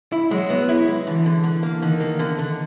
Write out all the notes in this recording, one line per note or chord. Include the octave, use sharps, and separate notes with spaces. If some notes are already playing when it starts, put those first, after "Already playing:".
E4
F#3 G#3
B3
E4
G#3
D3 E3
D3
D3
A#3
D3 D#3
A#3
D3
D3